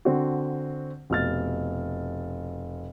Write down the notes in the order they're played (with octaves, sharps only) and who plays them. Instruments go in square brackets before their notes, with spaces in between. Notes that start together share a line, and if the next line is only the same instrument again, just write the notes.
[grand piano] D3 C4 F#4
F1 B2 F6 A6